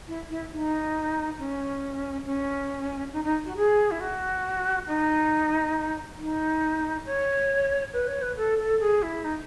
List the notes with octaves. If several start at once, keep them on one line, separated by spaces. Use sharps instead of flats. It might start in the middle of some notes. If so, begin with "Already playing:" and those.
E4
E4
D#4
C#4
C#4
D#4
D#4
F#4
G#4
E4
F#4
D#4
D#4
C#5
B4
C#5
B4
A4
A4
G#4
E4
D#4